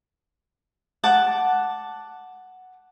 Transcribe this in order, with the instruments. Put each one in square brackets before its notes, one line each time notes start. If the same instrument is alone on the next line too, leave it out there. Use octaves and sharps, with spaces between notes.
[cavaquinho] F#5 A5 D6